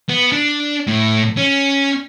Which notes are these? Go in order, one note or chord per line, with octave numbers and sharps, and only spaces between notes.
B3
D4
A2
C#4